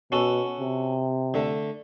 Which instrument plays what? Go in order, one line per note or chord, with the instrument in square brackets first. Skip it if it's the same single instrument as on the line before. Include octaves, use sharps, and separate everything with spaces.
[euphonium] B2 [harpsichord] C#4 F#4 A4
[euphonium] C3
[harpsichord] D3 A3